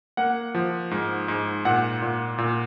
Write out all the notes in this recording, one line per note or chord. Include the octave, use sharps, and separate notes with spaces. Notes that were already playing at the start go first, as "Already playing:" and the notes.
A#3 F#5
F3
G#2
G#2
A#2 F#5
A#2
A#2